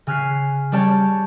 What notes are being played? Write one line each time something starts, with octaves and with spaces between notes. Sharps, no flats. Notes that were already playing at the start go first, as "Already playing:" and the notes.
C#3 G#5 F6 F#6 B6 C7
G3 C#4 C#5 D5 A5 G6